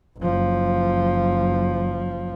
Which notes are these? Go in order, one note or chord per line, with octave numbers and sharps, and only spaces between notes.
F#1 F3